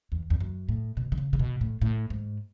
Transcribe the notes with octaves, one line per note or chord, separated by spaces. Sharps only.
E2
E2
F#2
A2
B2
D3
C#3
C#3
B2
A2
A2
G#2